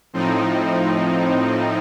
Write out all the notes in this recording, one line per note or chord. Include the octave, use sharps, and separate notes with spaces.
A2 F3 C4 D#4